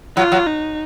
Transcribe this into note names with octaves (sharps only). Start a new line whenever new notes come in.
F#3 F4
F#3
D#4